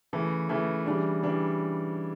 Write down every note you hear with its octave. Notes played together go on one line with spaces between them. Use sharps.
C#3 E3 A3
C#3 E3 A3
C#3 E3 G3 D4
C#3 E3 G3 D4